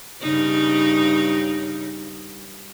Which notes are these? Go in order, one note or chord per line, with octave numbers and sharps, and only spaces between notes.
G2 C#3 D#4